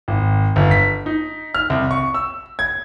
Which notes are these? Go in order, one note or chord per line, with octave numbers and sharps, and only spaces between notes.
G#1
G1
B6
D#4
F6
C2
C#6
E6
G#6